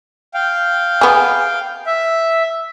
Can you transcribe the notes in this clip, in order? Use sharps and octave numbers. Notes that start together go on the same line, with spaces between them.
F5 G5
B3 G#4
E5